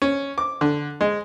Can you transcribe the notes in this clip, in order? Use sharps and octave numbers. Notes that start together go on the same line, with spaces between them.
C#4
D6
D3
G#3